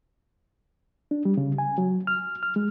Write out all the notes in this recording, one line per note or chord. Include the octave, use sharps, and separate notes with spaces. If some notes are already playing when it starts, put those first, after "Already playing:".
D4
G3
C#3
G#5
F#3
F6
F6
G#3